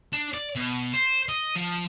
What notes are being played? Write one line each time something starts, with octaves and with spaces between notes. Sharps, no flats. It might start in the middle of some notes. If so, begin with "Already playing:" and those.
D4
D5
B2
C5
D#5
F3